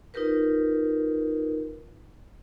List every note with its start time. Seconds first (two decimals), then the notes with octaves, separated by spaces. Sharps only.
0.14 D#4 F4 G4 A#4 B4